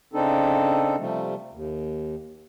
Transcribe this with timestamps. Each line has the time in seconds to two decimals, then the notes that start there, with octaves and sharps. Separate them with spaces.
0.13 C#3 C4 D4 D#4 A4
0.98 C3 F3 G3 A3
1.52 D#2